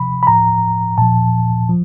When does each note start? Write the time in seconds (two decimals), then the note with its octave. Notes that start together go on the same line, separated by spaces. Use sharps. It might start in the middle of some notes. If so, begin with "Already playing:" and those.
Already playing: C3 F3 B5
0.23 B5
0.27 A2 F3 A#5
0.98 A#2 F3 A5
1.69 F3